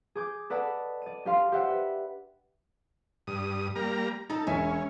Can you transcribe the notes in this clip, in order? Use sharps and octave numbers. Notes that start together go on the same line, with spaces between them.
G#4 D6 G6
A4 B4 D5 D#5 F#5 A5
D5 D#7
D4 G4 D5 F5 C6
G4 C5 E5 F#5 G5
B4
G2 D#6
G3 A#3 A#5
D#4 A4 A#5
E1 C#4 E5 G#5